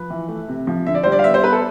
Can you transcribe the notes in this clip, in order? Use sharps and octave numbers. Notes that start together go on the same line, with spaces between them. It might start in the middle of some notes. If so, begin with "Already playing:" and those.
Already playing: F3 B4
E3
A3
C3
F3
D3 E5
D5
G3 C5
D5
F5
B3 E5
C5
B3 B4
A4